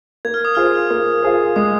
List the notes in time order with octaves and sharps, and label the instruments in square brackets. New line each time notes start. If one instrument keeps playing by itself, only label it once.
[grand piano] A#3 [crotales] G#6
[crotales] F6
D#6
[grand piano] F4 G#4 C5 [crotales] F6
[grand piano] A#3
F4 G#4 C5
[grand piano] G#3 [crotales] D#6